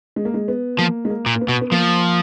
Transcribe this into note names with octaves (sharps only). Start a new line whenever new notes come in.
G#3
A#3
G#3
B3
F3 A#3
G#3
A#3
A#2
A#3
B3
B2
B3
F3 A#3